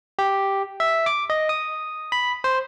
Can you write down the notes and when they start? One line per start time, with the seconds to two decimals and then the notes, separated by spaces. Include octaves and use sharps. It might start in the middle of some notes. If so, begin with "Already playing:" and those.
0.19 G4
0.80 E5
1.06 D6
1.30 D#5
1.49 D#6
2.12 B5
2.44 C5